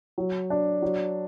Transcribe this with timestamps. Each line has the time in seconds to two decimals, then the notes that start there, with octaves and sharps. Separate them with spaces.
0.18 F#3
0.50 D4
0.82 F#3